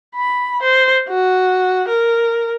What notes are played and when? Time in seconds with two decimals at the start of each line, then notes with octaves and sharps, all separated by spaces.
0.15 B5
0.62 C5
1.09 F#4
1.88 A#4